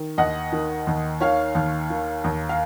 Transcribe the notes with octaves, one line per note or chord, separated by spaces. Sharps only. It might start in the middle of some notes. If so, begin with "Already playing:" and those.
Already playing: D#3
D#2 D#5 F#5
D#3
D#2
D#3 C#5 F5
D#2
D#3
D#2
F5